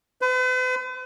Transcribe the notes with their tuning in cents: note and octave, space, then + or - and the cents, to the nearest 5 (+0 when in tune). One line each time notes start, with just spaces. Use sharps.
B4 +45